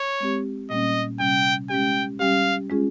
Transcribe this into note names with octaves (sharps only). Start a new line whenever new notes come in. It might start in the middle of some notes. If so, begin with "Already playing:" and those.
Already playing: C#5
G#3 C4 G4
A#2 G3 A#3 C#4 D#5
C3 G3 C#4 G5
G#3 C#4 G4 G5
G3 C#4 G4 F5
G#3 C#4 F4 G#4